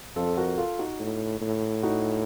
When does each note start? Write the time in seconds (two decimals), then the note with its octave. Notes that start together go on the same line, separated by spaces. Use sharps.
0.16 F2 F4 A4
0.37 F#4 A#4
0.58 F4 A4
0.79 D#4 F#4
1.00 A2
1.41 A2
1.83 D#4 F#4